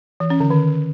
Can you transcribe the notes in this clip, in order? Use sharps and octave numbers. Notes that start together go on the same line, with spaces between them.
E3
C#4
D3
D#3